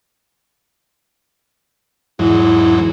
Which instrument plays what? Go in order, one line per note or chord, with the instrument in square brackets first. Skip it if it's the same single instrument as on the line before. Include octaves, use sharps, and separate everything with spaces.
[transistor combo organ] E2 G#2 F#3 [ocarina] E4